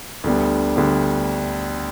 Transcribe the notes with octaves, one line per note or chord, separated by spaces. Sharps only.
D2 D3 G3 B3
D2 D3 G3 B3